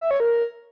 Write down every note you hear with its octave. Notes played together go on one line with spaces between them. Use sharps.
E5
C#5
A#4